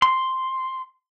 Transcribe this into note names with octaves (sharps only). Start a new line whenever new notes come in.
C6